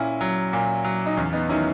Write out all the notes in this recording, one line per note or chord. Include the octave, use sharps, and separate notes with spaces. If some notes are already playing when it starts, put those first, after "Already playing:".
Already playing: A#2 C#4 E4
F#3
A#2
F#3
D#4
E2 C#4
B3 D#4
D#3 F#3 C#4 E4